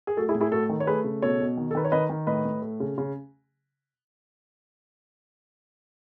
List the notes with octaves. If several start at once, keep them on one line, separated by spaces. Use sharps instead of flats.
G#4
A3 F#4 A4
E4 G#4
A2
E4 G#4
A3 F#4 A4
D#3
C#5
A3 G#4 B4
C#3
B2 A4 C#5
B2
D#3
A4
D#3 B4
C#5
D#3 B4 D#5
D#3
A2 B4 D#5
A2
A3
C#3
C#3